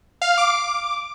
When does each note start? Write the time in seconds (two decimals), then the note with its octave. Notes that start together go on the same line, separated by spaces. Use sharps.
0.22 F5
0.38 D6